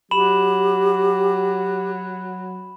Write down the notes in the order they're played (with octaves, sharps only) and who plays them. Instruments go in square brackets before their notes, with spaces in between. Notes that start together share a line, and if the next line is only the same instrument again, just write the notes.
[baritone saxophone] F#3 [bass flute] G4 [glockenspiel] B5 E7 F#7